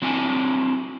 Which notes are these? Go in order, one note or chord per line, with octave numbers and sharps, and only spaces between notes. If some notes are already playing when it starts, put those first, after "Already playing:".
F#3 C4 D4 E4 G#5